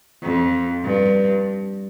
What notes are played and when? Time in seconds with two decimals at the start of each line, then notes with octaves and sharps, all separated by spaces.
0.23 F2
0.84 G2